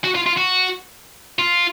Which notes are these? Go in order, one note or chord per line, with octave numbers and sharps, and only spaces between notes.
F#4
F4
F4
F#4
F4